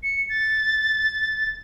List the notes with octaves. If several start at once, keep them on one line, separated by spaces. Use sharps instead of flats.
C#7
A6